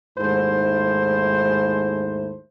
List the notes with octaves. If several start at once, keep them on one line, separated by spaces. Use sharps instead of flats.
D#2 G#2 A3 E4 C5